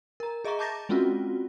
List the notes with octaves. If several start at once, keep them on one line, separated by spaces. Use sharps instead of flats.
A#4 A#5
G#4 D#5 E5 A#5 C#6
A5 A#5 D6 G6 A6 A#6
G#3 C4 C#4 F4 F#4